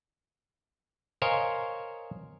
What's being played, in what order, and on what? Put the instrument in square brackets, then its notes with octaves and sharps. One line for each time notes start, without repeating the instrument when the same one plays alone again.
[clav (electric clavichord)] A#4 C5 C#5 D#5 F5 G#5